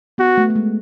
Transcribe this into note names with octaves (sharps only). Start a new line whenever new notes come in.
B3 F#4
A3
A3
G#3